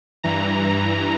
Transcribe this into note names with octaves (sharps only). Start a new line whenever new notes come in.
G2 E3 A#5